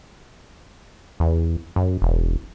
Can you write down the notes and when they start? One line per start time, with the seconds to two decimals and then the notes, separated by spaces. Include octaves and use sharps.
1.20 E2
1.76 F#2
2.02 E1